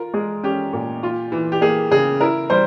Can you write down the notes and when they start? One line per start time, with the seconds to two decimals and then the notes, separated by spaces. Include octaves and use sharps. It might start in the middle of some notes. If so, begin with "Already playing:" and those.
Already playing: F4 A#4
0.14 G#3 G#4
0.43 C#4 G4
0.73 A#2
1.03 F4
1.32 E3
1.52 G4
1.61 A#3 G#4
1.91 C#3 G#4
2.21 E4 A#4
2.50 G3 C5